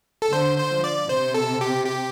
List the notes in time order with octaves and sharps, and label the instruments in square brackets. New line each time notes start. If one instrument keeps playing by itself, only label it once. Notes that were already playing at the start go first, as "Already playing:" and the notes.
[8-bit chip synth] A4
[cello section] D3 [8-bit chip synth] C5
[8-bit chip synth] C5
[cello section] F3
[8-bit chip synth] D5
[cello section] C3 [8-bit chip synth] C5
[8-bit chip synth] A4
G4
G4